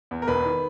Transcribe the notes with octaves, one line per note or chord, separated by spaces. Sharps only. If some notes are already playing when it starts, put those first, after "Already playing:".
E2
A#4
E1 B4
D#3